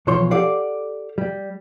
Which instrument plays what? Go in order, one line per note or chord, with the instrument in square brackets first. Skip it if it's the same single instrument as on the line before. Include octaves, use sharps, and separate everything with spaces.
[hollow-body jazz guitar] B1 E3 F3 C#5 C6
G4 A4 D5 F5 F#5
G3